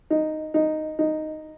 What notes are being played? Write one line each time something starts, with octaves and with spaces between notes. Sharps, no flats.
D#4
D#4
D#4